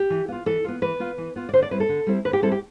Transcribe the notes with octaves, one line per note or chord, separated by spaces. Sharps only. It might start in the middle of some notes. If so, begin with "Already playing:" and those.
Already playing: G4
E3
B3 F4
E3 A4
B3 F4
E3 B4
B3 F4
E3
B3 F4
D5
D3 C5
D5
G3 C4 E4 B4
A4
D3
G3 C4 E4
D3 B4
G4
G3 C4 E4 A4
G4